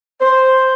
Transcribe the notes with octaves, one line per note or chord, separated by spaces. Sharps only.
C5